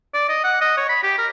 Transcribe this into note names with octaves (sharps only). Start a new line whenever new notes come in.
D5
D#5
F#5
D#5
C#5
B5
G4
A#4